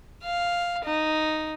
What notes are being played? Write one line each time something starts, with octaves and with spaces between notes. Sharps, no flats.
F5
D#4